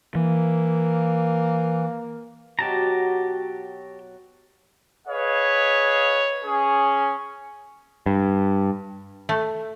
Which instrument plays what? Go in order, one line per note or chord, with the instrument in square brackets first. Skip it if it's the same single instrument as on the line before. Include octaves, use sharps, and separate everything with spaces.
[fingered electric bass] E3 [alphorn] A#3
[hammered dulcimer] B2 F#3 F#4 [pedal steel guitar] G4 A5 A#5
[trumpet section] G#4 B4 C#5 D#5 F5
C#4 G#4
[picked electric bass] G2
[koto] A3